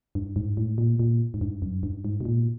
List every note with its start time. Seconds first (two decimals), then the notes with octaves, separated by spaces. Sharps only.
0.15 G2
0.36 G#2
0.57 A2
0.78 A#2
0.99 A#2
1.34 G#2
1.41 G2
1.62 F#2
1.83 G2
2.05 G#2
2.21 B2
2.25 A#2